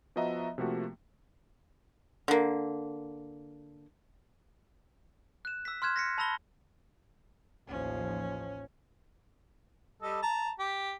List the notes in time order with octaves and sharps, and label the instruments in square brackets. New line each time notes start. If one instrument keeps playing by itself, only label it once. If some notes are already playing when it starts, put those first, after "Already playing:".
[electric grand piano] F3 B3 F#4 D#5 E5 A#5
C3 F3 A3 A#3 F#4
[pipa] D3 A#3
[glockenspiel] F#6 E7
E6 B6
C6 F6 F#6 G#6 E7
A#6 B6 C#7
A5 B5 E6 A#6 F7 G7
[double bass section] A1 D#2 F3 [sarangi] C#4
[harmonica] G3 A4 D#5
A5 A#5
G4